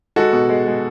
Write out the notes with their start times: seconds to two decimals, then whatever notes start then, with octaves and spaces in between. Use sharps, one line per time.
0.16 G#3 F#4 A4
0.33 B2
0.49 G#3
0.66 G#3